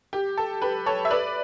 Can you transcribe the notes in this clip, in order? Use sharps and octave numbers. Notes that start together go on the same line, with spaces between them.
G4
A4
G4 B4
A4 C#5
E5
B4 D5